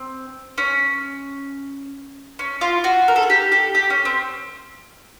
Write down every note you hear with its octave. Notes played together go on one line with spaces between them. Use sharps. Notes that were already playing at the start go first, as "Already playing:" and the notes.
Already playing: C4
C#4
C#4
F4
F#4
A#4
A4
G#4
G4
G4 A4
G4
C#4
C4